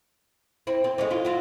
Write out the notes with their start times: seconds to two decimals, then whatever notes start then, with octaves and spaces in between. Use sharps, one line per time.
0.67 C4 E4
0.84 C4
0.98 G#3 A3 C#4
1.11 E4 F4
1.25 F#3 E4 F4